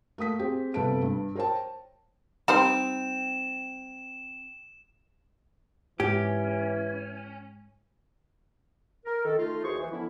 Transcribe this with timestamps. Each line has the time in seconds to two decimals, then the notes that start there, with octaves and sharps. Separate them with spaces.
0.18 A3 A#3 D#6 B6
0.39 C4 G4 G#4
0.74 G1 C3 A4 B4 A5 D7
1.02 G2
1.35 A#4 C5 C#5 G5 A5
2.48 G3 C4 D#4 C5 E7
6.00 G#2 E3 C#4 G4
9.05 A#4
9.24 D#3 A4
9.37 A3 D#4 F4
9.63 D#2 E3 F#4 G#4 C5 C#6
9.79 E3
9.91 D3 E3 F3 B3 C#4 E4